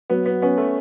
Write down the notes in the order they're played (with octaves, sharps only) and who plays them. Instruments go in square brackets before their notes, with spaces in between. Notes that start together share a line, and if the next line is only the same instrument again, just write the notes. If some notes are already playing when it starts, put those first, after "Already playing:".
[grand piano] F#3 [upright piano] B3
[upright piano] B3
[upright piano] B3 [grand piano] C#4
[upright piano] A3